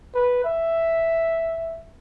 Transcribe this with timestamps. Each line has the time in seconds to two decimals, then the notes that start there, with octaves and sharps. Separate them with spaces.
0.15 B4
0.44 E5